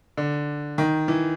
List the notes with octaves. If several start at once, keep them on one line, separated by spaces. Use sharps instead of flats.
D3
D#3
E3